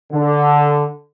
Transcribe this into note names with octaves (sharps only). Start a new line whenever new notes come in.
D3